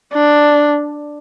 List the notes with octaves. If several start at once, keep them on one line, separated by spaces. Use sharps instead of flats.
D4